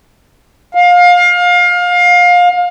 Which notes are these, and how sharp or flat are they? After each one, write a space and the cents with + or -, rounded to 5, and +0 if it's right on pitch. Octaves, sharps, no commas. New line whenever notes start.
F5 +25